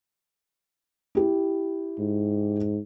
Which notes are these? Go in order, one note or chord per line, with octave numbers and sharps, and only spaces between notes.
E4 G4
G#2